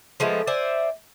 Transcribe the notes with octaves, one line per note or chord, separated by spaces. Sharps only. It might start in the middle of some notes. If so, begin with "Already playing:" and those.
F3 G#3 A3 B3
C5 D5 E5 G#5